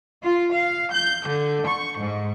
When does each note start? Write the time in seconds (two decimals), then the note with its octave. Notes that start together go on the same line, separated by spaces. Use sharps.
0.21 F4
0.51 F5
0.91 G6
1.24 D3
1.65 C#6
1.99 G#2